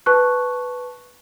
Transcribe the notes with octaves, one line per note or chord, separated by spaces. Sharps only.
B4 A5 C#6 F#6